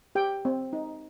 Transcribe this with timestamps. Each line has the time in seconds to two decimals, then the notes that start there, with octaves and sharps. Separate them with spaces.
0.15 G4 G5
0.45 C4
0.73 D#4